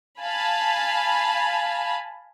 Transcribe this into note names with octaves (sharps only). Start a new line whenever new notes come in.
F5 G#5 A5 B5